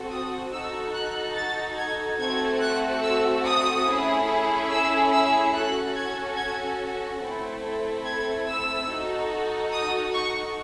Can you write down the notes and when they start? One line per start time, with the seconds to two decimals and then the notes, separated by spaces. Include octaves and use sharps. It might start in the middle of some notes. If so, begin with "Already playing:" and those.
Already playing: C4 F#4 A4
0.10 D#6
0.52 D#4 F#4 A4 E6
0.93 F#6
1.35 A6
1.78 G#6
2.19 A3 C4 F#4 A4 G#6
2.61 F#6
3.02 E6
3.45 D#6
3.86 A3 C#4 E4 G#4
4.70 E6
5.12 E6
5.53 C#4 F#4 A4 F#6
5.95 G#6
6.37 G#6
7.21 A3 C4 E4 A4
8.05 G#6
8.47 E6
8.89 D#4 F#4 A4
9.71 D#6
10.13 C#6